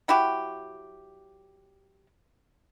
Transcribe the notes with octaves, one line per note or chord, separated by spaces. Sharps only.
F#3 E4 F#4 G4